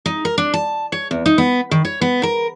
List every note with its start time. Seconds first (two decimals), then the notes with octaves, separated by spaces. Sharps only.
0.06 D#4
0.25 A#4
0.38 D4
0.54 A5
0.92 C#5
1.11 E2
1.26 D#4
1.38 B3
1.71 D#3
1.85 C#5
2.01 B3
2.23 A#4